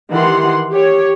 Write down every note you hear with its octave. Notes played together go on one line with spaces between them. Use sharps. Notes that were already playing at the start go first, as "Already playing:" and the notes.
D#3 E3 G4 F#5 C6
G4 C#5